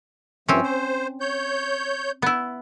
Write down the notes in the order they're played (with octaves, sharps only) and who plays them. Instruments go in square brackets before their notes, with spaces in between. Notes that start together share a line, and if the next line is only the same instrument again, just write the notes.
[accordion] G2 F3 A3 [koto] C4 C#4
[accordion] C5
C#5 G6
[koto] B3 E4